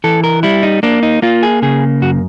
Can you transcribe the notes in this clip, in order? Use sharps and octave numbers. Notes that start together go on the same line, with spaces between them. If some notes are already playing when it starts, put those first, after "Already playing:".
E3 A4
A#4
G3 E4
D#4
A#3 D4
D#4
A#3 F4
G#4
C#3 G#4
F#2 F#4